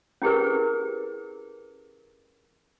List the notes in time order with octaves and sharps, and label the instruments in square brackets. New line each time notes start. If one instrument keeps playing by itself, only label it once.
[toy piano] C#4 E4 G4 G#4 A#4 B4